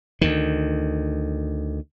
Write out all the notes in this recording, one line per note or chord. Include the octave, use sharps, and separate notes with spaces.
D2 D#3